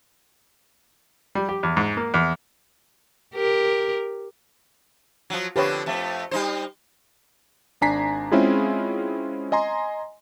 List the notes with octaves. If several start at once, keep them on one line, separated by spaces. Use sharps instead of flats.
G3
G4
E2
G#2
A#3
E2
G4 A#4
F3 F#3
D3 F3 C4 G4 B4 C#5
F2 A3
G3 D#4 C5
G#1 D4 G#5 A#5 B6 C7
G#3 C4 C#4 E4 F4 G#4
D#5 G#5 A#5 C6